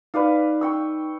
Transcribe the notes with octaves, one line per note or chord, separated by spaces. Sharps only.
D#4 B4 D5 F5
G5 C#6 E6